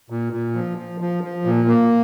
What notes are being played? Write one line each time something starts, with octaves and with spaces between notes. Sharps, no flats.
A#2
A#2
F3
F3
F3
F3
A#2
A#3